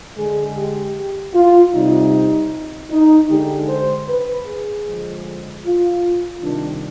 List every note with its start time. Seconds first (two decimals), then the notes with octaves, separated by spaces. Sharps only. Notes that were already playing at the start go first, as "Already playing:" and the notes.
0.17 D3 G#3 G#4
0.56 G4
1.34 F4
1.74 C3 G3 D#4
2.90 D#4
3.29 D3 G#3 G4
3.69 C5
4.08 B4
4.46 G#4
4.86 D3 F3 G#3
5.65 F4
6.42 C3 D#3 G3 D4